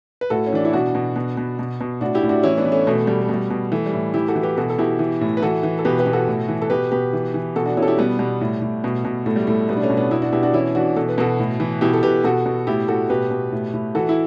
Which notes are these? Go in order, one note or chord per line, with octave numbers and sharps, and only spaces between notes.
B4
A2 F#4 A4
C#4
E3 D4
E4
B2 D4 F#4
B2
B2
B2
B2
B2
A2 D4 F#4
E4 G4
A2
D4 F#4
E3 C#4 E4
B3 D4
E3
A3 C#4
B2 A3
B2 G3
A3
B2 G3
B2
E3 A3
G3
A2
E3 E4 G4
F#4 A4
E3
G4 B4
B2 F#4 A4
A4
B2 E4 G4
E3
A2
B4
E3 F#4 A4
E3
A4
B2 G4 B4
G4 B4
B2
F#4 A4
A2
E3
A4
B2 G4 B4
B2 G4 B4
E3
E3
B2 F#4 A4
D4 F#4
B2 C#4 E4
A4
E4 G4
B2 G3 B3
B2 G3
A2
A2
B2
B2
A2 A3
G3
A2 A3
B2 G3 B3
D4
A3 C#4
B2
B3 D4
B2 E4
D4 F#4
B2 E4 G4
D4 F#4
E3 C#4 E4
E3 D4 F#4
B2 A4
B4
B2 F#4 A4
A2
E3
B2 E4 G4
A4
B2 G4 B4
B2 F#4 A4
B2
A2 E4 G4
A2 F#4 A4
B2 G4 B4
B2
A2
A2
E3 F#4 A4
E4